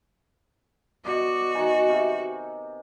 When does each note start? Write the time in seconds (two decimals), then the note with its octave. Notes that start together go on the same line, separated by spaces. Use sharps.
1.05 B2 F#4 D5 D#5
1.55 D#3 G#5
1.89 C3